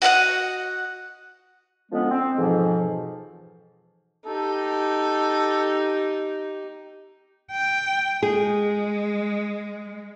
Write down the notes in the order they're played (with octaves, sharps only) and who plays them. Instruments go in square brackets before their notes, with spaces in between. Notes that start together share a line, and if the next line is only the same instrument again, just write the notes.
[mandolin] F#4 D#5 F5 F#5
[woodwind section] D3 F3 G#3 B3 C#4
C4
F2 G#2 B2 E3 F3
[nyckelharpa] D#4 G4 [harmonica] A4
[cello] G5
[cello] G#3 [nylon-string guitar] G#4